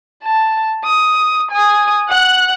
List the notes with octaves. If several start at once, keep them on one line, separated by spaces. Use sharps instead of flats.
A5
D#6
G#5 D#6
F#5 F#6